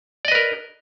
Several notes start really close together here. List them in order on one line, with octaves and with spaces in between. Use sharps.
D5 D#5 B4 A#4